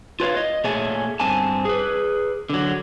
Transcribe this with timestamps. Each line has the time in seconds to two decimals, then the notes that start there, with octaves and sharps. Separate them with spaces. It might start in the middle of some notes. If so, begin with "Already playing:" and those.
0.20 F4 B4 C#5 F5
0.37 D#5
0.64 A#2 A3 G#4 C#5 E5 G#5
1.20 G2 C4 G#5 A5
1.65 G#4 B4
2.50 D3 F#3